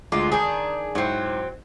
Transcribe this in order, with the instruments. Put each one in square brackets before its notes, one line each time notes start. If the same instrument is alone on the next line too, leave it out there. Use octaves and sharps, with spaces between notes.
[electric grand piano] D2 G#3 D6 [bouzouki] F4
[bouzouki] D#3 D4 G#4 [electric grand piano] G#5
[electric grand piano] G#2 E4 G5 [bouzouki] F#3 C4